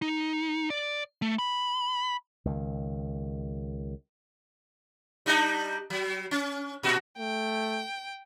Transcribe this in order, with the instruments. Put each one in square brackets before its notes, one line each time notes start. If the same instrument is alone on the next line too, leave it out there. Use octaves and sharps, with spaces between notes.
[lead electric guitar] D#4
D5
A3
B5
[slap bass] C#2 D#3
[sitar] G3 D4 D#4
F#3
C#4
A#2 F#4
[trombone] A3 [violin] G5